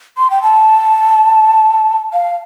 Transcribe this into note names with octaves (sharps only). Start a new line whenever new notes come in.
C6
G5
A5
F5